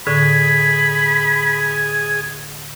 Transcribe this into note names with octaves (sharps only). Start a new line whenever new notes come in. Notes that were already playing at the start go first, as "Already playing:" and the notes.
A2 D3 G#4 B5